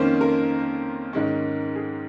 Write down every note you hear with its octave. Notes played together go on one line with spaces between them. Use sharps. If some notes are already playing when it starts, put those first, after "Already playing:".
Already playing: F2 D#3 A#3 C#4 C5
A#4
G#2 D#3 G#3 C#4
G#4